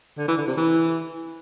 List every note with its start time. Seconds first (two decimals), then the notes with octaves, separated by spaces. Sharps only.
0.18 D3
0.28 E3
0.37 D3
0.47 C3
0.57 E3